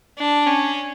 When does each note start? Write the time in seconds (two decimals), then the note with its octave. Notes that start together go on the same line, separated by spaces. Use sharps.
0.18 D4
0.47 C#4